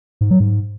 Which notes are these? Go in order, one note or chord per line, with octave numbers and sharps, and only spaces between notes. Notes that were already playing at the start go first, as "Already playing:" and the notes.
G#2
F#3
G#2